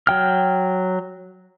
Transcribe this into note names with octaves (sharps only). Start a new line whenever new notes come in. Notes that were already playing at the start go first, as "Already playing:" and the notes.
F#3 G5 F6